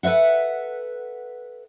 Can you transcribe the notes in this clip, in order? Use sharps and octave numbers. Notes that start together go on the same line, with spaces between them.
A4 B4 D#5 E5 F#5